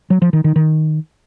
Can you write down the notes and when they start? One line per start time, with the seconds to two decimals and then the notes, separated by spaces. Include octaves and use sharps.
0.10 F#3
0.22 F3
0.33 D#3
0.44 D#3
0.56 D#3